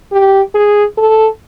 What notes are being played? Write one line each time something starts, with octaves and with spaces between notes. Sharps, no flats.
G4
G#4
A4